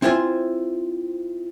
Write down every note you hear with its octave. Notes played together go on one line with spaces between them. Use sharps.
C4 E4 F4 C5 G#5